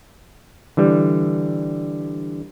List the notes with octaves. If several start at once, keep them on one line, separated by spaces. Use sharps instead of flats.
D3 E3 G3